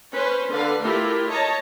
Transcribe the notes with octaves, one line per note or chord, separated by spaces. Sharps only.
C#4 B4 C5
D3 B4 F5
A3 E4 F4 G4 A#4
C#5 D#5 A5 A#5